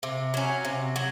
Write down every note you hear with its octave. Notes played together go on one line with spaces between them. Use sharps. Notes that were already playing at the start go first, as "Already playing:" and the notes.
C3
F#3 C#4
C3
F#3